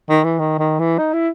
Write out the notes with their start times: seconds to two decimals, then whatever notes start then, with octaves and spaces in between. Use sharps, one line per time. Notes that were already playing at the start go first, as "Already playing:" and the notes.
0.09 D#3
0.24 E3
0.39 D#3
0.58 D#3
0.79 E3
0.98 D#4
1.13 E4